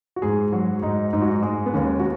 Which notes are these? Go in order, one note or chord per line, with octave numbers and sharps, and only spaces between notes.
F#4
G#2 G#4
F#3 F#4
G#2 D#4
G#2 D#4
F#4
D#4
G#3
B3
D#2 C#4
F#4